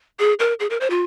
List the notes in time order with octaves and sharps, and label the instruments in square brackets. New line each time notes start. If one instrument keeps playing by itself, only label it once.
[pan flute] G#4
A#4
G#4
A#4
C5
F4